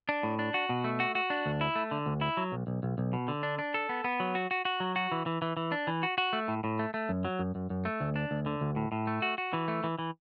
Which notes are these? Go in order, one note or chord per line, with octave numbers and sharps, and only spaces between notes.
D4
A2
D4
F#4
B2
A3
F#4
F#4
D4
D2
E4
A3
D3
D2
E4
F#3
B1
B1
B1
B1
B2
D3
D4
D4
A4
B3
B3
F#3
F#4
F#4
F#4
F#3
F#4
E3
E3
E3
E3
D4
E3
F#4
F#4
A3
A2
A2
A3
A3
F#2
F#3
F#2
F#2
F#2
A3
D2
D4
D2
D3
D2
A2
A2
A3
F#4
F#4
E3
A3
E3
E3